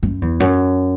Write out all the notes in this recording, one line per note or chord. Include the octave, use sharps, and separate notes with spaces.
F#2
E2
F#2